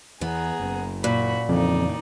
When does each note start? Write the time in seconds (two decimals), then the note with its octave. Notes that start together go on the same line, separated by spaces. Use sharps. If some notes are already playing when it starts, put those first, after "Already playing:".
0.21 E2 E3 B3 G#4 A#5
0.60 F#1 F#2
1.04 A#2 F#4 B5
1.49 F2 C#3 E3 D#4 D5